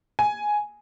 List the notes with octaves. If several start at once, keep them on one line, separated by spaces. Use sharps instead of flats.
G#5